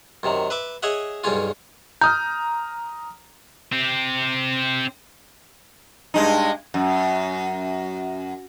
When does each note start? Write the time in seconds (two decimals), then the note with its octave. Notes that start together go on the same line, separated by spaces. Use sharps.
0.23 F#2 C3 D#3
0.50 B4 E5 D6
0.83 G#4 C#5 D#5 E5 F#5
1.24 B1 G2 C#3 C#4 F4
2.01 A#5 D#6 F6 G6
3.72 C4 G4
6.14 G2 G#3 D#4
6.74 F#2